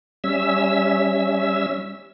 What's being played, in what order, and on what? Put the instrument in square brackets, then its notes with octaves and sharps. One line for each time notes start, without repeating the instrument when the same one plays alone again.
[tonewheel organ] G3 C#4 E5 E6